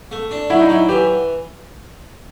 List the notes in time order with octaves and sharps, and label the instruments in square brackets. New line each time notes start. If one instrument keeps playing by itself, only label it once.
[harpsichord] A3
D4
[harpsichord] F#3 [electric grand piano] E4
[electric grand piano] D#4
[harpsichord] F#3 [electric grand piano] E4
[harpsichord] E3 [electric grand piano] G4